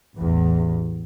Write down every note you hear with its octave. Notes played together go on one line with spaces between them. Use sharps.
A1 E2